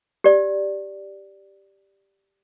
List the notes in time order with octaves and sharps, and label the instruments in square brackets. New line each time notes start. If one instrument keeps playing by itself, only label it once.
[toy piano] G4 D5